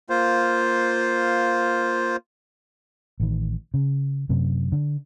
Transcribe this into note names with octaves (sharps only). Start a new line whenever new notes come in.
A#3 F4 C5
A1 D#3
C#3
F#2 C3
D3